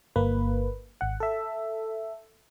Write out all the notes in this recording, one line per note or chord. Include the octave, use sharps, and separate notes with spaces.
G1 A#3 B4
G#1 F#5
A4 E5